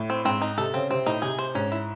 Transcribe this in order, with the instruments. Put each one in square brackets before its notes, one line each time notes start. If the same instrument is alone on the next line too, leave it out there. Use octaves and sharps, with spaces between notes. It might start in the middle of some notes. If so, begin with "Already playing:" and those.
Already playing: [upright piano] A2
[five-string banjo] C4
[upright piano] G#2 [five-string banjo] C4
[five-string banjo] D#4
[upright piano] C3 [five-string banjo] A4
[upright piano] C#3 [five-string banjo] C4
[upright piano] C3 [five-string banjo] C4
[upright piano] A2 [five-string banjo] D#4
[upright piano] C3 [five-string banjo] G#4
[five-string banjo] C5
[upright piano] G#2 [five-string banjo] C#4
[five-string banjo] E4